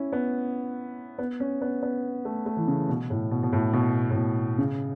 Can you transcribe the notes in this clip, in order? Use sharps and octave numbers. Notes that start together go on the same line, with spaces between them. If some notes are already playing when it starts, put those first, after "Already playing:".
Already playing: C#4 E4
B3
B3
C#4
B3
B3
A3
A3
E3
C#3
B2
A2
B2
B2
A2
B2
A2
B2
C#3